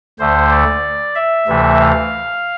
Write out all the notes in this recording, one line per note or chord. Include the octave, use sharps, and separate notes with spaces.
D2 D3 A3 C5
D5
E5
D2 C3 E3 A3
F5